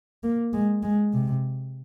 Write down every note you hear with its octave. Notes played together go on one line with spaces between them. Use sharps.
A#3
G#3
G#3
C3